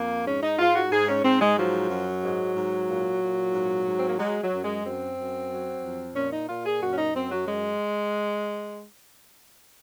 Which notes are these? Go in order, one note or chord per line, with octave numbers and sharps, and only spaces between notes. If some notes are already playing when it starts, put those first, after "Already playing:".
Already playing: F2 A#3
G#2 C#4
D#4
G#2 F4
F#4
G#2 G#4
C#4
G#2 C4
G#3
F3 F#3
F#2
G#2
G#2
A#2
A#2
G#2
G#2
C4
A#3
F#3 G#3
F#3
F#2
G#3
F#2 C4
F#2
F#3
F2
A#2 C#4
D#4
A#2 F4
G#4
F#2 F#4
C#4
D#4
F#2 C4
F#3
G#3